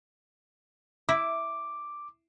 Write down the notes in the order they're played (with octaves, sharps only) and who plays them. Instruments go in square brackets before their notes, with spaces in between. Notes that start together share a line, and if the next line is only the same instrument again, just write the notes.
[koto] E4 [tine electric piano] D6